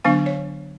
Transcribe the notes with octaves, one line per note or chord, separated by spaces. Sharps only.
D3 F#3 B3 D4 F5
C#5